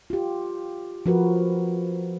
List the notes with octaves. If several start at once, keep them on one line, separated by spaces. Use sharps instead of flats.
F4 G4
F3 F#4 A#4 B4